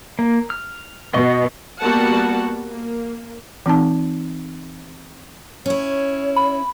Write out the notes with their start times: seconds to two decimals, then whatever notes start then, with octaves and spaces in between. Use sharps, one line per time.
0.19 A#3
0.50 F6
1.14 B2 B3 D#5 C#6
1.80 G3 A#3 B3 F#4 F#5 A5
2.66 A#3
3.66 E3 C4 D#4 A5
5.66 C#4 E4 C#5
6.36 B5